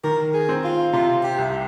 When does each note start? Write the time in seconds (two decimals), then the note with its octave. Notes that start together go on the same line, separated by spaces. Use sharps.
0.04 D#3 A#4
0.34 G#4
0.49 C4
0.64 F4
0.93 C3 F4
1.23 G4
1.38 C2